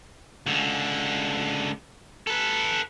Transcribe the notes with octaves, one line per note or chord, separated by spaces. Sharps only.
C#2 D3
A4 B4